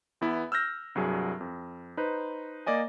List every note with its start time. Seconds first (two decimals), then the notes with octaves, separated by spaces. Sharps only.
0.21 E2 B3 E4
0.52 E6 F6 G6 A#6
0.95 C2 G2 F#3 G#4
1.41 F2
1.97 D#4 B4 C5
2.66 A#3 D5 D#5 G#5